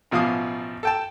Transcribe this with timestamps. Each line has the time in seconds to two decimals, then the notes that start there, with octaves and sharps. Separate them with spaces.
0.11 A1 B2 F3 F5 D6 D#6
0.83 A4 G5 A5